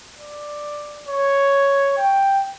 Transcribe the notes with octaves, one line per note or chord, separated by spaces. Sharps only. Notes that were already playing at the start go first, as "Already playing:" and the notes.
D5
C#5
G5